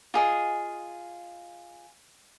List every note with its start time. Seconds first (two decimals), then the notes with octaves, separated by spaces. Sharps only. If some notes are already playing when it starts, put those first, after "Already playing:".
0.14 F4 G#4 D#5